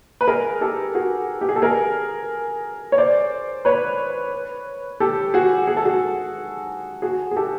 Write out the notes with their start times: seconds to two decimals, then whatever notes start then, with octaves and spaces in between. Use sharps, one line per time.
0.21 B4
0.28 G#4 A#4
0.61 G4 A4
0.95 F#4 G#4
1.41 G4
1.49 G#4
1.56 A4
1.62 G#4 A#4
2.92 C#5
2.98 C5 D5
3.65 B4 C#5
5.00 G4 A4
5.34 F#4 G#4
5.67 G#4
5.77 A4
5.85 F#4 G#4
7.02 F#4 G#4
7.31 G#4
7.36 G4 A4